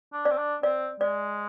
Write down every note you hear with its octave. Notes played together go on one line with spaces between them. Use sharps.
D4
D5
C4
D4
C4 D5
G#3 D5